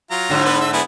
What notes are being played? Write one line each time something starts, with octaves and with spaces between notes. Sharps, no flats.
F#3 F4 A#5
G#2 D3
B3 B4
E5
B3 E4 G#4